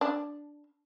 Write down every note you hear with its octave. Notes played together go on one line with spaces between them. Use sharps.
D4